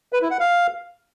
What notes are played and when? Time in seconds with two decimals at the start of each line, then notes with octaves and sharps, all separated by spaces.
0.13 B4
0.22 E4
0.31 F#5
0.40 F5